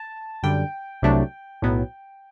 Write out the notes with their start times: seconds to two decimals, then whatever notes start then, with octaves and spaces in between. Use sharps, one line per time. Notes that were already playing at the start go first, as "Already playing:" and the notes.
Already playing: A5
0.43 F#2 D3 G3 G5
1.02 C2 C3 F#3 A3 D4
1.62 B1 A2 F#3 B3